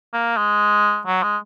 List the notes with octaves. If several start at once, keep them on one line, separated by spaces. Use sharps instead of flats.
A#3
G#3
F#3
G#3